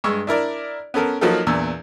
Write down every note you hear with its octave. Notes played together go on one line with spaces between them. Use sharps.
G2 G#3 C#6 E6
D4 E4 A#4 D5
B3 C#4 A4 A#4
F3 F#3 A#3 D#4 A4
E2 A#2 D4 E6